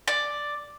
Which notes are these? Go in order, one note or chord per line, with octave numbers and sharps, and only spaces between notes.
D5